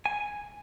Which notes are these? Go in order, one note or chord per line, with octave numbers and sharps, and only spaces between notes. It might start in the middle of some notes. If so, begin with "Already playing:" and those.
G#5